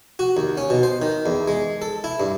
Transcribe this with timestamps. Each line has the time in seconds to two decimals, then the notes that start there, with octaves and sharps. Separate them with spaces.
0.19 F#4
0.37 D#2
0.57 C#4
0.70 B2
0.83 C5
1.02 D#3
1.26 E2
1.48 G#3
1.82 A4
2.04 E4
2.20 G2